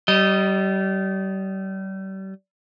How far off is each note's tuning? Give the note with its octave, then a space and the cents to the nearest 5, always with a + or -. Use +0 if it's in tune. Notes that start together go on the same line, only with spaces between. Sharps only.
G3 -35 D#5 +0